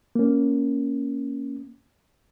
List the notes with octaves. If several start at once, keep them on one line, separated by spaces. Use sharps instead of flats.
A#3 C#4